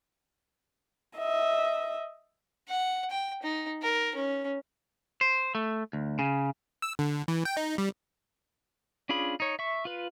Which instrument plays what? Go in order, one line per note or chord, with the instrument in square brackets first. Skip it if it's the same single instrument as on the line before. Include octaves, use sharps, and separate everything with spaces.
[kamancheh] D#5 E5
[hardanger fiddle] F#5
G5
D#4
A#4
C#4
[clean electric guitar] C5
A3
D2
C#3
[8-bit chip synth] E6
D3
E3
G5
D#4
G3
[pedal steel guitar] C#4 D4 F4 G#4 B5
D#4 C#5
E5 C#6
F4 B4